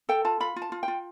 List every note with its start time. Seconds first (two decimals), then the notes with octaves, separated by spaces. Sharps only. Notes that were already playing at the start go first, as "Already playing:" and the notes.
0.09 A4 G5
0.25 F4 A5
0.40 F4 B5
0.56 F4
0.62 A5
0.72 F4
0.83 G5
0.88 F4